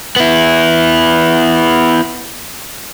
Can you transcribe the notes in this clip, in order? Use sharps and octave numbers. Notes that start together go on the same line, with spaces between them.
B3 E4